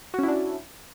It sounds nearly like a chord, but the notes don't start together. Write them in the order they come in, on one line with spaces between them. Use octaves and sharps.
F#4 C#4 E4 D4